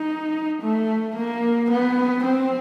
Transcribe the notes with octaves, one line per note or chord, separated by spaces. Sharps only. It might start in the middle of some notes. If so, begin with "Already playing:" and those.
Already playing: D#4
A3
A#3
B3
C4